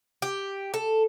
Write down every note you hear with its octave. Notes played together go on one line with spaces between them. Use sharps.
G4
A4